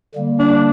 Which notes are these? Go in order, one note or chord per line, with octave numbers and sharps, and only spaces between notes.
D3 G3 A#3
D4